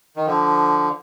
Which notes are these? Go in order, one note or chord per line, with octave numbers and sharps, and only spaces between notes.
D#3
D3 F3